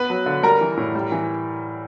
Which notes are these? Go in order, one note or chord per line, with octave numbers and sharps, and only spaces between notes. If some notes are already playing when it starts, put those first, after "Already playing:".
Already playing: B3 B4 B5
F#3
D3
G3 A#4 A#5
E3
A2
G3
E3